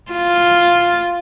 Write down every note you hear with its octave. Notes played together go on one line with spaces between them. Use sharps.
F4